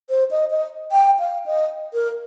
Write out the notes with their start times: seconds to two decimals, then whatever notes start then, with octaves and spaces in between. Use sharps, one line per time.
0.10 C5
0.31 D#5
0.51 D#5
0.92 G5
1.19 F5
1.46 D#5
1.94 A#4